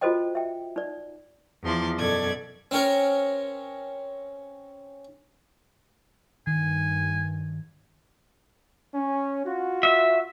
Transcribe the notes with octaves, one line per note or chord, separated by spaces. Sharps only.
F4 F#4 A4 C5 D#5 G5
E5 G5
D#4 D5
E2 F3 C6 D6
F#2 B2 A4 D5 G#6
C4 C#4 A#4
G2 D#3 G#5
C#4
F4 F#4
E5